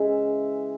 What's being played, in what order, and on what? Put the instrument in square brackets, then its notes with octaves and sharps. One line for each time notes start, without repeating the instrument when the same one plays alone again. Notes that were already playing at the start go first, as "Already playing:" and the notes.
Already playing: [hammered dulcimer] C#3 E3 G#3 E5